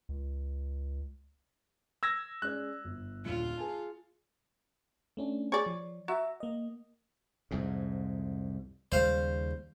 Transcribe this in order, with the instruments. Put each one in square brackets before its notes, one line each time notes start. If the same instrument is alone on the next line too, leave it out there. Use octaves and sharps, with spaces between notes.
[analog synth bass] C#2
[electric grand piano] E6 G#6 A#6
[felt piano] G#3 C#4 D5 [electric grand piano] F#6
[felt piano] G1
[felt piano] D#1 D3 C#7 [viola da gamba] F4
[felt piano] G#4 G#5 A5
[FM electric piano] A3 C#4 D4
[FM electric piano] G#4 [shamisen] C#5 D5
[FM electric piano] F3
[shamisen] F#4 [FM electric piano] E5 A#5
[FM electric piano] A#3 D#5
[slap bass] C2 F2 G#2
[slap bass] D#2 C#3 G3 [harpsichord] C5 F5